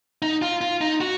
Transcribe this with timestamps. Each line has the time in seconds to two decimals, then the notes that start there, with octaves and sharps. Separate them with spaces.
0.22 D#4
0.42 F4
0.61 F4
0.81 D#4
1.01 F#4